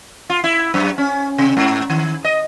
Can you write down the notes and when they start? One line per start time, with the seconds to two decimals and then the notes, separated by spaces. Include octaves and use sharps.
0.30 F4
0.44 E4
0.74 F#2
0.98 C#4
1.38 C3
1.57 G#2
1.90 D#3
2.24 D#5